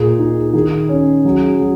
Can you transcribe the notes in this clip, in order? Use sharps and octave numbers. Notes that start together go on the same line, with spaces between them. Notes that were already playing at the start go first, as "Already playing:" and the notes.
Already playing: A#2 G#4
D#4
D#3 G#4
C#4
F#3
F#3